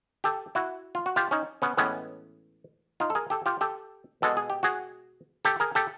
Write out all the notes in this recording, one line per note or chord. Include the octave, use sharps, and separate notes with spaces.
G4 A4
E4 F#4
F4
F#4
F4 G4
C#4 D#4
B3 C#4
A2 E3 G#3 B3 C#4
D#4 F4
A4
G#4 A#4
G4 A4
F4 G4
G4 A4
B2 G#3 A4
G#4
G4
F#4 G#4
G4 A4
G#4 A#4
G4 A4